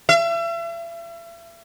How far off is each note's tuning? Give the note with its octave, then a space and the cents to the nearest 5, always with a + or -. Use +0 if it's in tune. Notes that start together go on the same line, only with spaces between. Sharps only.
E5 +40